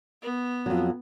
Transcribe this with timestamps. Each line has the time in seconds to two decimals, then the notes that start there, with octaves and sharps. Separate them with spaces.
0.22 B3
0.66 F2 F#3